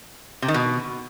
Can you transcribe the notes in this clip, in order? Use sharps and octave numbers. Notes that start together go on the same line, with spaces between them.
C3
D#3
B2